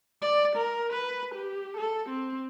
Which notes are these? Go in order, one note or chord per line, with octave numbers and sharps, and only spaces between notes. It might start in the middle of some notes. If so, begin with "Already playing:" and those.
D5
A#4
B4
G4
A4
C4